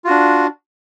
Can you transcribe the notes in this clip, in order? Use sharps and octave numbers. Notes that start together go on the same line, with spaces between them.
D4 F4 F#4